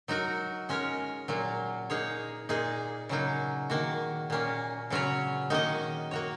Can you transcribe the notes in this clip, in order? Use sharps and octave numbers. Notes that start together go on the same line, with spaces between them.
F#3 D#4 F#4 A#4
G#3 C#4 A#4 C#5
A#2 F#3 A#3
A#3 D#4 G#4 C#5
A#2 A#3 D#4 G#4
C#3 F#3 A#3 D#4
D#3 A#3 F#4
A#2 A#3 C#4
C#3 F#3 C#4 F#4 C#5
D#3 A#3 D#4 F#4 D#5
A#3 F#4 C#5